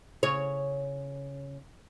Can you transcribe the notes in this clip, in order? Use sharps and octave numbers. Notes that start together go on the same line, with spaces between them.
C#3 C#5